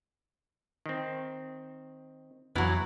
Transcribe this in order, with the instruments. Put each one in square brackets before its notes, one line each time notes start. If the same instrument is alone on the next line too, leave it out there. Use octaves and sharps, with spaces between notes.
[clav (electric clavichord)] D#3 C4
[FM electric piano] F2 [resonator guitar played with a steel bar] E3 F#3 [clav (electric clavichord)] B3